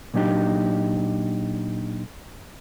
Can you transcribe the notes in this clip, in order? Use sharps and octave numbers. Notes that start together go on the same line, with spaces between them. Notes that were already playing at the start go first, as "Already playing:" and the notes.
A#2 F#3 D4 D#4 G4